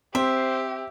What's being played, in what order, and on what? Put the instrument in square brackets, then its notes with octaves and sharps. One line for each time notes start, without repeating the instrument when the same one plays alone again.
[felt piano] C4 [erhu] G4 [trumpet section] C5 [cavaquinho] E5